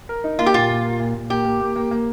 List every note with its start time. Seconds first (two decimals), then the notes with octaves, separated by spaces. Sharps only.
0.09 A#4
0.24 D#4
0.39 A#3 F4
0.46 G4
0.54 A#2 F4
0.69 A#2
0.85 A#4
0.99 A#2
1.14 A#2
1.30 A#3 G4
1.45 A#3
1.60 A#3
1.76 A#3
1.91 A#3